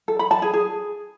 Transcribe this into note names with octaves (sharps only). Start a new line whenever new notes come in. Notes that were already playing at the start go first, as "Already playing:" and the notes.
A4
B5
A5
G#4
G#4